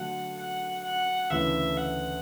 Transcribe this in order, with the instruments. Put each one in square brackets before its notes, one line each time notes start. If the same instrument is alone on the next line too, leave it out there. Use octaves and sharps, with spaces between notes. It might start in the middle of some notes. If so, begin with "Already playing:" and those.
Already playing: [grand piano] D3 F#3 A3 [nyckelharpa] F#5
[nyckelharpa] F#5
F#5
[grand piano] D2 C#3 E3 A3 E4 [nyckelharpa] E5
[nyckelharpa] F#5